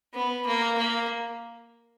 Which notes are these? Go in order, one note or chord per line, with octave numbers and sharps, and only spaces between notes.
B3
A#3
A#3